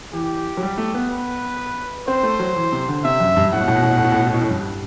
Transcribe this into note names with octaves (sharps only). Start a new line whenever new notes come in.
E3 G4
F#3
G3
A3
B3
B4
C4 C5
A3
F#3
E3
C3
D3
C3 E5
F#2
G2
A2 F#5
B2
A2
B2
A2
B2
A2
B2
A2
B2
A2
B2
A2
G2